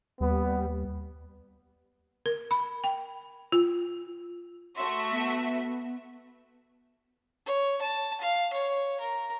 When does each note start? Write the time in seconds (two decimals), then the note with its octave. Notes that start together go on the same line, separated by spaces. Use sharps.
0.20 D#2 G3 B3
2.26 A#4
2.51 B5
2.84 G5
3.52 F4
4.77 A3 F#4 E5 C6
5.11 B3
7.46 C#5
7.82 A5
8.21 F5
8.53 C#5
9.00 A#4